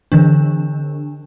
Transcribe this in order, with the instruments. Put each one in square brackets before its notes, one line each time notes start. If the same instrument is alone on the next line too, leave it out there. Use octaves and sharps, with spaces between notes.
[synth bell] D3 E3 D4